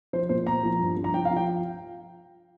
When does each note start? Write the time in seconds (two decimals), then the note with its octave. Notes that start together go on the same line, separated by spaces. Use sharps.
0.13 F3 C5
0.29 A#2 C5
0.47 A#2 A#5
0.63 F3
0.80 G2
0.97 F3
1.04 A#5
1.14 F3 G5
1.25 F5
1.31 F3
1.37 G5